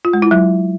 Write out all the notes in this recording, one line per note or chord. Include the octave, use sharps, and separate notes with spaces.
F4
G#3
E4
F#3